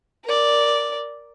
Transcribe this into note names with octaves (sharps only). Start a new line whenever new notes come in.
A#4 D5